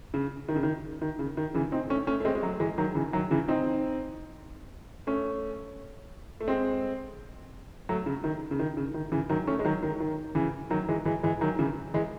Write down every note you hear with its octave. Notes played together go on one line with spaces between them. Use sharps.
C#3
D#3
C#3
D#3
D#3
C#3
D#3
C#3 E3
C4 D#4
A3 C#4
A3 C#4
A3
G#3 C4
G#3
F#3 A3
E3 G#3
D#3 F#3
C#3 E3
D#3 F#3
C#3 E3
C4 D#4
A3 C#4
A3
G#3 C4
F#3 A3
C#3
D#3
C#3
D#3
C#3
D#3
C#3 E3
D#3 F#3
A3 C#4
G#3
D#3 F#3
D#3
D#3
C#3 E3
D#3 F#3
E3 G#3
E3 G#3
E3 G#3
D#3 F#3
C#3 E3
E3 G#3